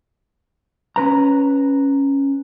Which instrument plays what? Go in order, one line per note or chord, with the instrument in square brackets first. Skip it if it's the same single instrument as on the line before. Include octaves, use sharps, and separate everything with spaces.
[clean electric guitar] C#4 B4 A#5